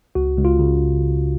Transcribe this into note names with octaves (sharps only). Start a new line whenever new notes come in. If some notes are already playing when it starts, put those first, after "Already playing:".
C#2 F#4
C#2
F4
C#3